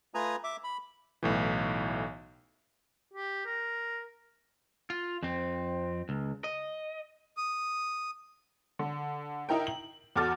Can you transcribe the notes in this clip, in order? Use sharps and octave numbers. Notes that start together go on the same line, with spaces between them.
A3 F4 B4 G#5 A#5 D#6
E5 D6
B5
B1 A2 E3
G4
A#4
F4
F2 C4
C#2
D#5
D#6
D3
D#4 E4 A#4 G5
F#7
E2 F#4 A4 D6 F6 A6